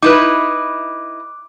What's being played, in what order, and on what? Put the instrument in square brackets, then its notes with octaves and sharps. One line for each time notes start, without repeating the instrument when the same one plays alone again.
[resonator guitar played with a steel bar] D#4 E4 B4 [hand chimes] D6 F#6